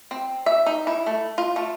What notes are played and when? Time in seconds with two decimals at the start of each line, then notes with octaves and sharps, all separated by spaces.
0.11 C4
0.46 E5
0.66 D#4
0.87 E4
1.06 A3
1.38 F4
1.56 A3